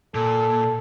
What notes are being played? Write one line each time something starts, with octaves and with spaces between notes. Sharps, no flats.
A#2 A4